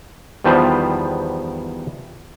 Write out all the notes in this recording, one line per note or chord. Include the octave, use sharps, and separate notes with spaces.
E2 D#3 F3 G3 B3 C5